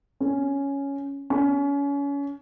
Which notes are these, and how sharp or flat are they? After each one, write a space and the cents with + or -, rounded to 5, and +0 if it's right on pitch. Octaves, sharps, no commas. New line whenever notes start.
C#4 +5
C#4 +30